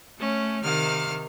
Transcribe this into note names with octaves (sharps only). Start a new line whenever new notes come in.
A3 C#4
C3 D#3 F5 F6